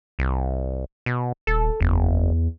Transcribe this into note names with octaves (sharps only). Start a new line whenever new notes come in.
C2
B2
D#1 A4
F#1 E2